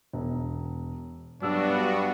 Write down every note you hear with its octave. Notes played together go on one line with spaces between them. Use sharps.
E1
G2 F#3 B3 D4 F#4 E6